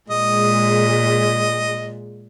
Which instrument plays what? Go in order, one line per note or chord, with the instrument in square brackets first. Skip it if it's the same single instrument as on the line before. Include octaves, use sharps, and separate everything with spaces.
[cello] A#2 [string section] G#3 [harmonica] D#5